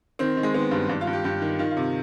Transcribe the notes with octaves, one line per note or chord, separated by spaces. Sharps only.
D#3 C4
D#3
G#3
D#3 B3
G2
G2 D4
F4
G2
G4
G2 G4
D#3
D#3 F4
F4
C3